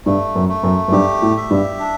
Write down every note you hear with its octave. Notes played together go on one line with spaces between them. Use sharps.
G2 A3
F#2
A3
F#2
F#2
G2 G4
A2
E5
G2
D4